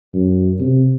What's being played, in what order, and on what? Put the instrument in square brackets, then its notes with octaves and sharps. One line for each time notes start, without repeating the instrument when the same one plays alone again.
[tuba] F#2
C3